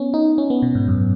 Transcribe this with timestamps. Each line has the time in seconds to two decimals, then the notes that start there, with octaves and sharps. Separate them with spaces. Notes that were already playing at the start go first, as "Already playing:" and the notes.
Already playing: B3 C#4
0.14 D#4
0.38 C#4
0.50 B3
0.62 B2
0.75 G#2
0.88 F#2